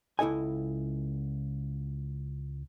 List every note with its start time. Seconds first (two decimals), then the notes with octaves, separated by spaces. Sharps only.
0.19 C#2 E4 A4 D#5 G#5